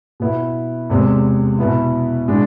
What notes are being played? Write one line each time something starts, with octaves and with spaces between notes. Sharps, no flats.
B2 B3 E4
E2 C3 G#3
B2 B3 E4
B2 G#3 D4